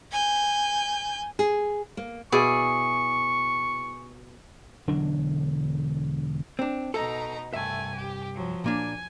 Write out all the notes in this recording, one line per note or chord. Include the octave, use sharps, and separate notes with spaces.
G#5 G6
G#4
A#3
B2 E4 G#4 D5 C#6
E1 D3 F#3 D4
C4 D4
B2 D#4 A4 A#5
C2 G2 A3 E5 G#5
G4
F3 F#3
A#2 A#3 D4 G#5